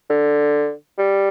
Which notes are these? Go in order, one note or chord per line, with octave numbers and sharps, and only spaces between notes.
D3
G3